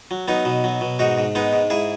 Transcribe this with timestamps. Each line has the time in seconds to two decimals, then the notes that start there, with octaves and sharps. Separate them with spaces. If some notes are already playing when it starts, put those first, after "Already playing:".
0.11 F#3
0.28 F#3 B3 D#4
0.45 B2
0.64 F#3
0.81 B2
0.99 G#2 D#4 F#4
1.18 G#2
1.35 G#3 B3 D#4
1.53 G#2
1.70 G#2 E4 G#4